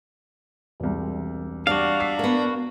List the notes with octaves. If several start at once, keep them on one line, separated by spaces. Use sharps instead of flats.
E1 C2
G3 D4 F#4 D5 F5
E6 B6 C7
A#3 B3